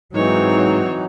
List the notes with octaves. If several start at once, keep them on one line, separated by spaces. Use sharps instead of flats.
G#2 E3 F#3 C4 D#4 C#5